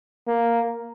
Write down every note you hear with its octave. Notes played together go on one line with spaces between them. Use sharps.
A#3